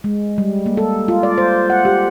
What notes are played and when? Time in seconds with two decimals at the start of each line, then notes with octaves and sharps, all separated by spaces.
0.04 G#3
0.38 G3
0.66 A#3
0.77 A4
1.08 F4
1.23 D5
1.38 C5
1.70 F#5
1.85 G4